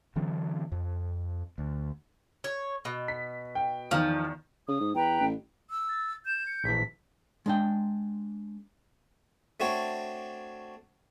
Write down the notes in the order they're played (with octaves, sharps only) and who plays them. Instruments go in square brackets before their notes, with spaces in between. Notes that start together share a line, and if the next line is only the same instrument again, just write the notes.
[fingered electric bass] D3 E3 F#3 C4
F2
D2
[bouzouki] C#5
B2
[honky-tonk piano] B6
G5
[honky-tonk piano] E2 D#3 [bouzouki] F3
[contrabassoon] C#3 [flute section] D#6
[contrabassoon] G#2
[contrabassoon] E2 [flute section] B4 G5 A#5
[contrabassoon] A1
[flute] E6
[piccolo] A6
[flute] G6 [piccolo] E7
[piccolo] C#7
[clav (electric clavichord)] A#1 E3 [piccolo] B6
[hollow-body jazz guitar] G#3 D4 G5
[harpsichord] A3 C4 D4 F#4 C#5